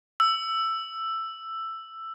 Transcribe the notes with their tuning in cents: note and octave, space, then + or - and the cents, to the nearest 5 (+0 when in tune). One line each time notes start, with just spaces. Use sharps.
E6 +10